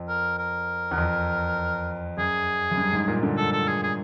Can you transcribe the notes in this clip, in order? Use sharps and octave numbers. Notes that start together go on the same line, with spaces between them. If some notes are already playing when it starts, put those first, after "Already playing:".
Already playing: F2
A#4
A#4
E2
F2
F#2 G#4
F#2
G2
G#2
A#2
D3
A4
A4
G#4
G#4